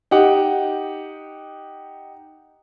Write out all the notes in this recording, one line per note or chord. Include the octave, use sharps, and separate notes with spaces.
D#4 G4 F#5